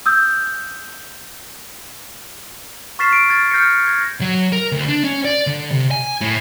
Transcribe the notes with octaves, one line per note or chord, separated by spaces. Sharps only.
D#6 E6 G6
C#6 F6 A6 B6 C7 E7
D7
F6 G#6 A6
F6 G6 A#6 C7 C#7
G#6 A#6
F#3
A#4
D2
D4
C#4
D5
D3
C3
G#5
A2